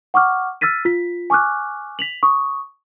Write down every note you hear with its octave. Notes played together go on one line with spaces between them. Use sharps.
F#5 C#6 D6 F6
E6 F6 A6 B6 D#7
F4 B6
G#5 C#6 D6 F6 F#6
B6 F7 F#7
C#6 D#6